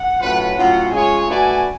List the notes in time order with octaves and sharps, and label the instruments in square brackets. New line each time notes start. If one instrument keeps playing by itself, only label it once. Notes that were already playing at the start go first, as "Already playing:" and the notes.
Already playing: [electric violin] F#5
[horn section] A2 F#3 C#4 F4 B4
[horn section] A2 F#3 C#4 F4 [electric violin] F#5
[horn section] G#3 C#4 F4 G#4 C#5 [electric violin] G#5
[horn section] A3 D4 F#4 B4 D5 [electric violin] G#5